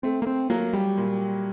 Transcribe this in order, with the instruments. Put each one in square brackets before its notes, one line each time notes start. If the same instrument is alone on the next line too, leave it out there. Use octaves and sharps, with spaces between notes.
[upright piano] A3 [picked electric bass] C4
[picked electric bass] A#3
C4
[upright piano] F#3 [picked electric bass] A#3
[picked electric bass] G3
[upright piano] A#2